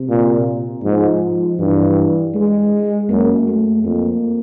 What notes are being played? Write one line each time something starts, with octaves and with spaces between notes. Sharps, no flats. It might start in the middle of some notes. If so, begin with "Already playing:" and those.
Already playing: C3
A#2
G#2 F3
G2 E3
G#3
F#2 A#3
A3
F2 A#3